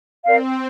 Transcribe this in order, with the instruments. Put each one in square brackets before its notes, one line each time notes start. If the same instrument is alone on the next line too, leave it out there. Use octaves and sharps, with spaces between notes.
[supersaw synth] C4 [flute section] A#4 D5 F5